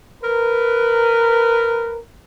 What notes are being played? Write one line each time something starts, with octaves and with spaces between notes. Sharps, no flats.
A#4 B4